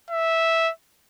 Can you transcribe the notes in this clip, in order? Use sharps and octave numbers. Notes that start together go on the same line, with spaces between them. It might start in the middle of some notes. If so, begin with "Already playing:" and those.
E5